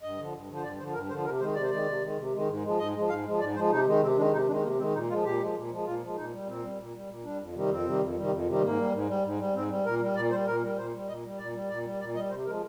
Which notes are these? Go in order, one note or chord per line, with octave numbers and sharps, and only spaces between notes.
G2 D#5
D3 F3
G2
D3 F3
C5
G2 D5
D3 F3 C5
G2 A#4
D3 F3 C5
C3 A#4
D#3 G#3 C5
C3 D5
C5
D#3 G#3 D5
C3
D#3 G#3
C3
D#3 G#3
G#2
F3 G#3
G#2 D#5
F3 G#3
G#2 F5
F3 G#3
G#2 D5
F3 G#3 C5
C3 D#4
D#3 G#3
C3 C4
D#3 G#3 D4
C3 D#4
D#3 G#3 D4
C3 A#3
D#3 G#3 C4
A#2 D#4
F3 G#3 F4
A#2 G4
F3 G#3
A#2
F3 G#3
A#2 F4
F3 G#3
A#2 D#4
G3
A#2 C4
G3
A#2
G3
A#2
G3 D4
F2
C3 D#3 G3
F2 C4
C3 D#3 G3
F2
C3 D#3 G3
F2
C3 D#3 G3
G#2 A#3
G3
G#2
G3
G#2
G3
G#2 C4
G3
A#2 A#4
G3
A#2 D5
G3 C5
A#2 A#4
G3
A#2 C5
G3
A#2 D#5
G3
A#2 D5
G3
A#2 D5
G3
A#2 D5
G3 D#5
C3 C5
F3 G#3 A#4